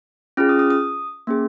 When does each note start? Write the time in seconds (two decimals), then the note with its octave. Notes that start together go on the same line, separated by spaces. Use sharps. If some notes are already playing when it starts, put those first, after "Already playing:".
0.37 C#4 F4 G#4 F6
0.49 D#6
0.59 D#6
0.71 D#6
1.27 A#3 C#4 G#4